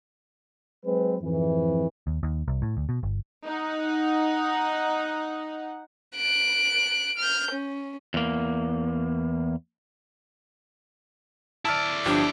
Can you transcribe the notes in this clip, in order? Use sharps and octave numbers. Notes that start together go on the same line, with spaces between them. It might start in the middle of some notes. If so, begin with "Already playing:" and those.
F#3 G#3 C4 B4
F2 G#2 E3
D#2
D#2
C2
A2
D2
B2
G1
D#4 F#5
F#6 D7
F6 G6
C#4
E2 A#3
E4 D5 A5 E6 F6
G1 F3 D4 G4